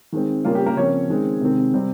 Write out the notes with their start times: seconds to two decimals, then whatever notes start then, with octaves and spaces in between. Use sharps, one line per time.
0.12 D#3 G#3 C4
0.45 C#3 G3 A#3 C#4 F4
0.55 G4
0.66 A#3 A#4
0.76 C#3 F3 C4 C#4 C#5
1.09 D#3 G#3 C4
1.41 C3 D#3 G#3 C4
1.74 C3 G3 C4